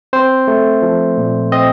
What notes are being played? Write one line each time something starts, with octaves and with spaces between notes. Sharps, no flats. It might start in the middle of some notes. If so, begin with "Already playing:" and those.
C4 C5
A3
F3
A#2
C4 D#5